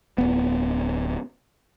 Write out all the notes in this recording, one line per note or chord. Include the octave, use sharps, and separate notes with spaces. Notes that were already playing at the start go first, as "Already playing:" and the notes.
D1 G#1 B3